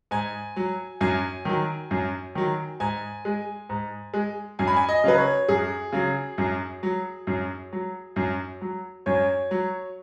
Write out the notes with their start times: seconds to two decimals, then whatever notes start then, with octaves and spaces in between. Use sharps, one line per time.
0.11 G#2 G#5
0.56 F#3
1.01 F#2 G#5
1.45 D#3 F#3
1.91 F#2
2.35 D#3 F#3
2.80 G#2 G#5
3.25 G#3
3.69 G#2
4.14 G#3
4.59 F#2 G#5
4.67 B5
4.76 G#5
4.89 D#5
5.04 C#3 F#3 B4
5.18 C#5
5.48 F#2 G#4
5.92 C#3 F#3
6.38 F#2
6.83 F#3
7.27 F#2
7.73 F#3
8.16 F#2
8.61 F#3
9.06 F#2 C#5
9.51 F#3